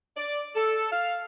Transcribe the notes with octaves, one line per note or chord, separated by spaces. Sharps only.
D5
A4
F5